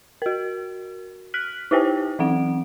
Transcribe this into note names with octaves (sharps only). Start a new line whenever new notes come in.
F#4 A#4
F6 F#6 B6 F#7
D#4 E4 G4 B4 C5 G5
E3 F#3 C4 F#5 D7